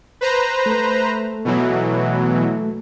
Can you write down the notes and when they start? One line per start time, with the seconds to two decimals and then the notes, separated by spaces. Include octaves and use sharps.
0.21 B4 C5 A#5
0.66 A3
1.45 B2 E3 F#3